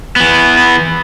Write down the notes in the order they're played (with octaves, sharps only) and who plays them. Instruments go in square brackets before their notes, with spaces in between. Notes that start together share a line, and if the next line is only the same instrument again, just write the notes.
[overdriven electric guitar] E3 B3